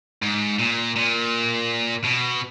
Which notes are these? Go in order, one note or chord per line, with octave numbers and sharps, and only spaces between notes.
G#2
A#2
A#2
B2